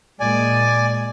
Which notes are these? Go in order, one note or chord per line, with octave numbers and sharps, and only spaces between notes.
A#2 G#3 D5 G#5